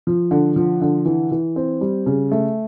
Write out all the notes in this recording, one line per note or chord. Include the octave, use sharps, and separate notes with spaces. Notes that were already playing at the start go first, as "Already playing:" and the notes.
F3
D3
F3
D3
E3
E3
C4
G3
C#3
A3